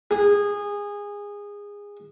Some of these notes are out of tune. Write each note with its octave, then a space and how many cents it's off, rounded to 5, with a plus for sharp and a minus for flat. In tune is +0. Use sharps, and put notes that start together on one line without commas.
G#4 -20